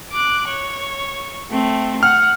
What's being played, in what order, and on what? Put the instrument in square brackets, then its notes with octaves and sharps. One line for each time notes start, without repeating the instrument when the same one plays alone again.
[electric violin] D6 F#6
C#5
A3 C4
[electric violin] F#5 [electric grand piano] F6